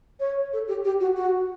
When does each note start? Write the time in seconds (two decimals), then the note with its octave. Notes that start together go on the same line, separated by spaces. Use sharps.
0.20 C#5
0.53 A4
0.68 G4
0.85 G4
1.00 F#4
1.17 F#4